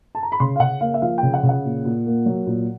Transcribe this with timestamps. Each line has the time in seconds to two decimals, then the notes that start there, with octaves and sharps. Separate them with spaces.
0.15 A5
0.23 A#5
0.32 B5
0.40 C#3 C6
0.56 F5
0.60 C#3 F#5
0.81 A#3 F5
0.94 E5
1.02 F3 F5
1.18 C#3 G5
1.34 F#5
1.43 C#3
1.49 F#5
1.65 A#2
1.85 A#2
2.06 A#3
2.26 F#3
2.47 A#2